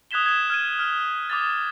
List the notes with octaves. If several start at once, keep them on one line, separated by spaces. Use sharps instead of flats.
D#6 F#6 G#6 B6 E7 G7
G#6 E7
F6 G#6 D#7
F6
D6 D#6 A6